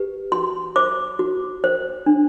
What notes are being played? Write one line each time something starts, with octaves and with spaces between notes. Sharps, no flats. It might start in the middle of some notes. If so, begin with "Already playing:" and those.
Already playing: G4 B4
F#4 C6
C5 D6
F#4
C5
D4